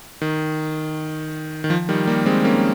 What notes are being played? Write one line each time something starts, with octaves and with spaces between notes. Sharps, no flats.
D#3
D#3
F3
D#3 G3
G3 A#3
G#3 C4
A#3 C#4